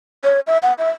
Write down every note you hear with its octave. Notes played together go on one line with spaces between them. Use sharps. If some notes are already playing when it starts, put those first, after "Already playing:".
C#5
E5
F#5
E5